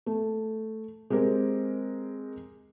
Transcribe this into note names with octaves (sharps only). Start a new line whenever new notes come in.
A3
G#3 C4 G4 A#4